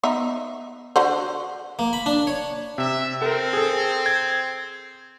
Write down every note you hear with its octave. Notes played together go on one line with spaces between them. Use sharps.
B3 D#4 E5
D3 F#4 C5
A#3
B5
D4
C#5
C3 E5
C4 A4 A#4
G#4 A4
G#6